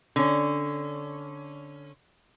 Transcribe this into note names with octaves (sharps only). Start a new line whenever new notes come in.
D3 C#4